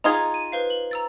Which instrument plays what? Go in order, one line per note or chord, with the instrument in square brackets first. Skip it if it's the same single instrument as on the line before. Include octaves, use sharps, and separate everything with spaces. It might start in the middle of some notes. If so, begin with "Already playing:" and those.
[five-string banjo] D#4 F4 G#4 [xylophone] A#5 D#6 G#6
[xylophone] D#7
B4 C5 F5
F#7
A#5 E6 A6